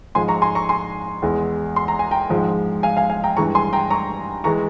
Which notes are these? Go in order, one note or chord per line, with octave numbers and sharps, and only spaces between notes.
G#2 F3 G#3 G#5 C6
A#5 C#6
G#5 C6
A#5 C#6
G#5 C6
E2 E3 G#3
C6
A#5
G#5
G5 A#5
G#2 F3 G#3
F5 G#5
F5 G#5
F5 G#5
G5 A#5
G2 E3 G#3 A#5 C#6
G#5 C6
G5 A#5
A#5 C#6
E3 G#3 A#5 C#6